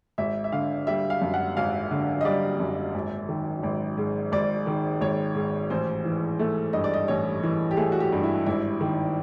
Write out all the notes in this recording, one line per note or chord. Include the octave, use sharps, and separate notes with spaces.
G#1 E5
E5
D3 F5
G3 E5
F5
F#2
F#5
G#1 F5
D3
D#5
G3 D5
F#2
G#1
D#3
G#1
G#2
G#1 D5
D#3
G#1 C#5
G#2
A1 C5
E3
A3
G2 D#5
D5
D#5
A1 C#5
E3
G4
A3 G#4
F#4
G4
G2
E4
G#1 E4
D#3